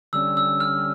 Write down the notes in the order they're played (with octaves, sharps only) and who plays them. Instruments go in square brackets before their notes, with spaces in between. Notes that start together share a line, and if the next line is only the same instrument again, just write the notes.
[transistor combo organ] D3 G3 C#4 [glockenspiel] E6
[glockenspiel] E6
F6